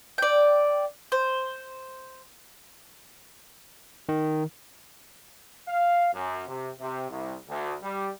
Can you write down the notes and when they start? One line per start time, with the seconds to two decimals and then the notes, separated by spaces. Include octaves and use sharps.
0.18 D5 G5
1.12 C5
4.09 D#3
5.67 F5
6.14 F#2
6.48 C3
6.80 C3
7.09 C2
7.48 D2
7.83 G3